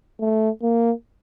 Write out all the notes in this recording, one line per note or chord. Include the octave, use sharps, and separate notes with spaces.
A3
A#3